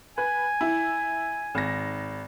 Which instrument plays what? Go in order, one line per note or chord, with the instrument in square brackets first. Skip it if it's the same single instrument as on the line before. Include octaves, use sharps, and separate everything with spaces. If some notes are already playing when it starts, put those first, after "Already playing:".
[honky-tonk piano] B4 [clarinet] G#5
[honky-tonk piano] E4
G#1 A#6